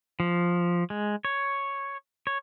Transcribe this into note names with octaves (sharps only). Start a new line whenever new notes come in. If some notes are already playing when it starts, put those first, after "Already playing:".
F3
G#3
C#5
C#5